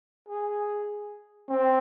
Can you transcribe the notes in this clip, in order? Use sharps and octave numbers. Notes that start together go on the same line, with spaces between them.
G#4
C4